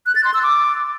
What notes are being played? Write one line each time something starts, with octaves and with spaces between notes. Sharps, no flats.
F#6
A6
C6
E6
D6